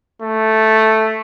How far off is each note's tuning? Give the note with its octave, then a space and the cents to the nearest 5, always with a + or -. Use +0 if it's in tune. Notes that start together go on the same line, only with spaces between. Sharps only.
A3 +0